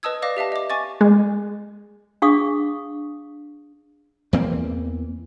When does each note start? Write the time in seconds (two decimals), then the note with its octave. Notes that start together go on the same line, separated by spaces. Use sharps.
0.03 B4 D#5 A5 D#6 E6 G#6
0.22 B4 D5 F5 D6 A#6
0.37 G4 E5 F5 A5
0.52 D#5 D6
0.70 G#5 C#6 D6 A6
1.01 G#3
2.22 D4 G#4 F5 C#6 D#6
4.33 E2 E3 A#3 C4